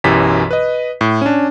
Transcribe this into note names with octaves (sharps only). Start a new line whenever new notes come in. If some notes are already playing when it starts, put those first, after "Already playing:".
B1 F#2 E3 G4 B6
B4 D#5
A2
C#4 D4